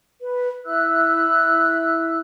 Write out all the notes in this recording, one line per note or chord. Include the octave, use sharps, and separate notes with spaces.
B4
E4 E5 E6 F#6